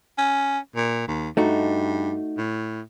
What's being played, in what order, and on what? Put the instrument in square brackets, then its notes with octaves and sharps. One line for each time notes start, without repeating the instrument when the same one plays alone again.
[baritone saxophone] C#4
A#2
D#2
[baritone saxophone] G2 [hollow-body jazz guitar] A3 D#4 F#4
[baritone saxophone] A2